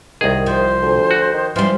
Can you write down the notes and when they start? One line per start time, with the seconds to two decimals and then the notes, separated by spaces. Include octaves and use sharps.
0.21 C2 D#3 G#4
0.46 F3 C5
0.82 D2
1.11 F#4
1.33 D#3
1.56 E3 F3 G3 C6